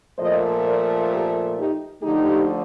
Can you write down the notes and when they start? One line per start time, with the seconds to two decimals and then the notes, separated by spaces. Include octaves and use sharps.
0.18 A#2 F3 A3 C5 D#5
0.65 A#4 D5
1.11 G4 A#4
1.57 D#4 G4
2.02 D3 F3 A3 D#4 G4